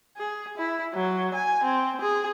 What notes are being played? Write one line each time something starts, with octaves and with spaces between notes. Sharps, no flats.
G#4
E4
F#3
G#5
C4
G#4